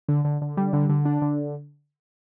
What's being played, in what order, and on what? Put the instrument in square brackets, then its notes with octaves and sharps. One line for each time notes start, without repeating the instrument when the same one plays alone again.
[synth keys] D3
D3
D3
G3
D3
D3
D4
D3